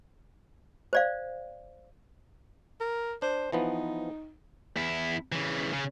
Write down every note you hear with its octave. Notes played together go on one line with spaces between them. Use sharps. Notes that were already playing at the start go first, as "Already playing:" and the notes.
C5 D5 F5
A#4
D4 C5
E3 F3 B3 D#4
E2 E4
C#3 E3
C#3